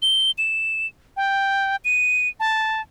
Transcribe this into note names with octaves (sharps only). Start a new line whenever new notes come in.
G7
E7
G5
D#7
A5